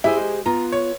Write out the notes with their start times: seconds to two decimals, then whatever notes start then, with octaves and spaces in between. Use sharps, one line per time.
0.04 E4 G4 G#4 C5
0.17 G#3
0.46 B3 F4 A#5
0.72 C#5